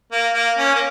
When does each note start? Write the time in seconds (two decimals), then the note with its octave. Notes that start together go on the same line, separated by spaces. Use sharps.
0.12 A#3
0.35 A#3
0.58 C#4
0.75 A#3